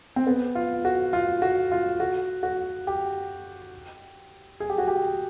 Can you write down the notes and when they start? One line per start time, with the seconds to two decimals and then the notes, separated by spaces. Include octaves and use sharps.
0.16 C4
0.27 B3
0.55 F4
0.85 F#4
1.13 F4
1.42 F#4
1.72 F4
2.00 F#4
2.43 F#4
2.87 G4
4.60 G#4
4.70 G4
4.78 F#4
4.88 G4